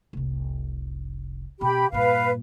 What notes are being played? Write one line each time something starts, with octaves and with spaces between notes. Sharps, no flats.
F1 C2
B2 G4 B5
G2 A#2 B4 F5